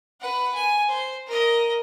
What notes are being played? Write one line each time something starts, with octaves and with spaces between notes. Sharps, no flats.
B4 F#5
G#5
C5
A#4 D#5